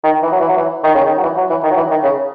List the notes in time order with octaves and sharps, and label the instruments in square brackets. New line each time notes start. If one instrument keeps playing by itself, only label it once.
[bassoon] D#3
E3
F#3
E3
F#3
E3
D#3
C#3
D#3
F#3
E3
F#3
E3
D#3
F#3
E3
D#3
C#3